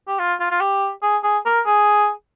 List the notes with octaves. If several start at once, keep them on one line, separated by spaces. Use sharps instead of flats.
G4
F4
F4
F4
G4
G#4
G#4
A#4
G#4